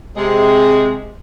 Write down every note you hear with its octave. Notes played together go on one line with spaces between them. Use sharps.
C3 G#3